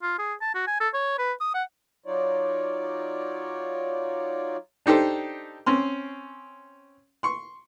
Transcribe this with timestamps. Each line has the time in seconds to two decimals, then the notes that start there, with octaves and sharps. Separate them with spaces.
0.03 F4
0.19 G#4
0.41 A5
0.54 F#4
0.67 G#5
0.80 A4
0.94 C#5
1.19 B4
1.41 D#6
1.54 F#5
2.06 F#3 D#4 F4 C#5 D5
4.86 D4 D#4 G4 A4 C5
5.66 C4 C#4 C6
7.23 C6 C#6